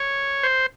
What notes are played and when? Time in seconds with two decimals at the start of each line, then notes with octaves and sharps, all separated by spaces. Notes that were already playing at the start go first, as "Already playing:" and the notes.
Already playing: C#5
0.43 C5